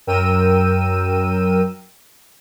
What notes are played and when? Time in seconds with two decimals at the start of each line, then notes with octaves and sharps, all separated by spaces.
0.07 F#2 A#4 G5 E6 D#7